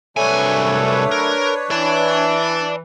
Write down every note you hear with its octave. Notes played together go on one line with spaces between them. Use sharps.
C2 F#3 A3 D4 B4 C#5 G#5
A#4
E3 D5 A5